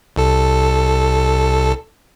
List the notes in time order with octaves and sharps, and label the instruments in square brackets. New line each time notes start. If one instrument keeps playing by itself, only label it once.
[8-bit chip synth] C2 A4